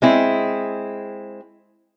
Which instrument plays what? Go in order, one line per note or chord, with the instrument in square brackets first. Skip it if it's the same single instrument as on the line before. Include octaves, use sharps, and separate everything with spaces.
[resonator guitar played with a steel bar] G#3 C4 E4